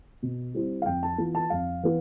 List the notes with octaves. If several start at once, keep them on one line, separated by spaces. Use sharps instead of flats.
B2
G3 C4 E4
F5
F2 G5
A5
E3 B3 F4
A5
F2 F5
E3 B3